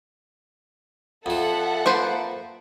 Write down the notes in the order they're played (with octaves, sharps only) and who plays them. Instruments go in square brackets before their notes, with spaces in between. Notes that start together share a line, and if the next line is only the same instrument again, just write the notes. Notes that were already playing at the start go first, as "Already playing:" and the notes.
[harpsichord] F2 F3 [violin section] A4 E5 F#5
[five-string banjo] A#3 B4 C5